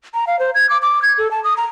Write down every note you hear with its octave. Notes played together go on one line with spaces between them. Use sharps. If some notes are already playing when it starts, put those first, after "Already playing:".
A#5
F5
C5
G#6
D6
D6
G#6
A4
A5
D#6
A#5